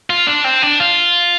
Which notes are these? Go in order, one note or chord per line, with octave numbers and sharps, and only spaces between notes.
F4
D4
C4
D4
F4